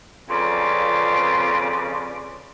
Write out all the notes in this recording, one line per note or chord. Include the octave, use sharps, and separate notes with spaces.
F2 C#3 F4 B4 D5